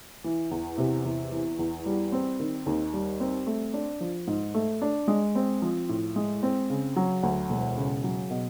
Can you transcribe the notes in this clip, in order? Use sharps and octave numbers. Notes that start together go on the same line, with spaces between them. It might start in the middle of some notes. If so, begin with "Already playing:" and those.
E3
E2
C3
E2
E3
E2
G3
C4
D#3
D#2
G3
C4
A3
D4
F3
G#2
A3
D4
G#3
C4
F3
A2
G#3
C4
C#3
F#3
D2
E1
C#3
F#3
B2